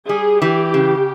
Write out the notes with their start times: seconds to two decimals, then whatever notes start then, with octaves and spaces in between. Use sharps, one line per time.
0.09 G3 G#4
0.42 E3 G4
0.74 C#3